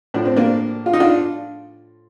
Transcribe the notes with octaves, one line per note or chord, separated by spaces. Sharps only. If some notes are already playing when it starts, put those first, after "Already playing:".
A2 F3 D4
C4
A#3 D4
F4
D#4
D4 F4